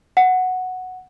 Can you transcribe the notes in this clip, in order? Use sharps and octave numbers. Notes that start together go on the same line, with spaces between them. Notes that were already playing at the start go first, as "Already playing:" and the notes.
F#5